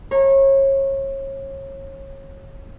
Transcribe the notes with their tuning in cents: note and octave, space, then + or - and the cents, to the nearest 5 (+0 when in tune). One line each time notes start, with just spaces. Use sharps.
C#5 -30 A#5 +0